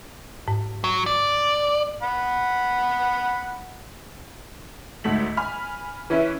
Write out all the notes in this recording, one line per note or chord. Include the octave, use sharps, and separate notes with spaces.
G#2
F#3
D5
F#5 B5
D2 G#2 A3 B6 F#7
G#5 B5 F6
E3 C#4 E4 B4 E5